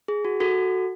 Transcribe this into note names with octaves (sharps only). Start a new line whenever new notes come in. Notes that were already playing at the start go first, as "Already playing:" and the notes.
G#4
F#4
F#4 A4